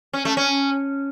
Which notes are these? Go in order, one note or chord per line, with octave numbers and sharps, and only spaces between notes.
C#4
A3
C#4